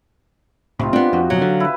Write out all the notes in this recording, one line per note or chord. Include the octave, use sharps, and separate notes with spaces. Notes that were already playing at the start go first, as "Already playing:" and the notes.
C2 A2 C3 D#4 F4
B3 C4 D4
F2 F#4
F#1 F2 B2 F#3
D3 F5
E4 B4